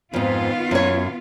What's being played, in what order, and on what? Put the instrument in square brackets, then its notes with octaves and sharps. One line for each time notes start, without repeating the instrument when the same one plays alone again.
[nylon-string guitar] F2 G#2 [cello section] D#3 B3 F4
[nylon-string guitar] F#2 C#5